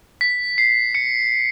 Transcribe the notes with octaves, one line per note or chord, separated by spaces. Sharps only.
B6
C7
C#7